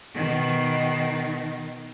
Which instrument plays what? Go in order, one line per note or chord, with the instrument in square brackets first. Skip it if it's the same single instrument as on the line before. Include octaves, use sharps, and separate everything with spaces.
[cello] B2 D#3